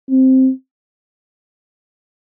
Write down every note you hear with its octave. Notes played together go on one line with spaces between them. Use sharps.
C4